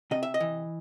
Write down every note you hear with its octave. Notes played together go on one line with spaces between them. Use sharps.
C3 D#5
E5
D#5
E3